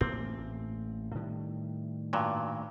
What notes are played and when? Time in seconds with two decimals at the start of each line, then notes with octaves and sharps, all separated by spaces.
0.01 A1 A2 A#3 C4
1.15 A2 D#3 G3
2.13 G2 A#2 F#3